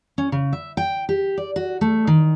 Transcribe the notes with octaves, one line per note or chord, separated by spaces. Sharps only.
C#4
C#3
E5
G5
G4
D5
F#4
A3
D#3